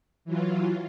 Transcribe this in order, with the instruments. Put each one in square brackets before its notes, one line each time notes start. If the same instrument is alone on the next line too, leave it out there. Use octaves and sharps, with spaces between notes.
[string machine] E3 F#3 F4